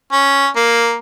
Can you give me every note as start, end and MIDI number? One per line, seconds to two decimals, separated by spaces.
0.12 0.48 61
0.56 0.96 58